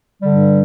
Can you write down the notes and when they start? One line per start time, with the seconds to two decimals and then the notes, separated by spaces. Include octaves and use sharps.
0.22 G2 D3 G3